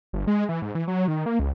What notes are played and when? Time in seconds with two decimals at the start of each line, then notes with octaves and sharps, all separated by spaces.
0.13 G1
0.27 G#3
0.49 E3
0.62 G#2
0.75 E3
0.88 F#3
1.08 D#3
1.26 A#3
1.39 C#2